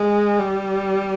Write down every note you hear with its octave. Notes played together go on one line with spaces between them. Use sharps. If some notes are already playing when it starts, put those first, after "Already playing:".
Already playing: G#3
G3